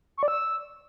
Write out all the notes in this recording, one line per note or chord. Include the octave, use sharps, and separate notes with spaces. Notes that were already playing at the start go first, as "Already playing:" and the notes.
C#6
D5
E6